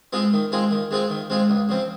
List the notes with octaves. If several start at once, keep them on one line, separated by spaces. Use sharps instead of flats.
G#3 C4 F4 G#4
D#3
G#3 C4 F4 G#4
D#3
G#3 C4 F4 G#4
D#3
G#3 C4 F4 G#4
C#2
C#3 F3 C4